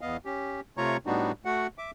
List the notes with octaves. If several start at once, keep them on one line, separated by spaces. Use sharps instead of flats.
E2 B3 D#5 F5
C#4 G4
C3 A3 F4 C#5 A#5 C#6
A2 G3 B3 D4 D#4 F#4
A3 F#4 F#5
E5 D6